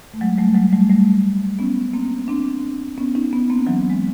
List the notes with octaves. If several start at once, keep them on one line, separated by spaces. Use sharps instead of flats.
A3
F#3 G#3
G3 A3
F#3 G#3
G3 A3
G3 A3
B3 C#4
A#3 C4
C4 D4
B3 C#4
C#4 D#4
B3 C#4
A#3 C4
E3 F#3
G#3